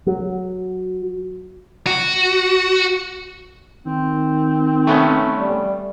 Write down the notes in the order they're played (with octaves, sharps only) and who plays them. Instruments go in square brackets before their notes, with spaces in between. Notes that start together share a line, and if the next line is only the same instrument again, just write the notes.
[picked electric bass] F#3
[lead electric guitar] F#4
[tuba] D#3 [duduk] C4
[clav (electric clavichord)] A3 B3 C#4
[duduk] G3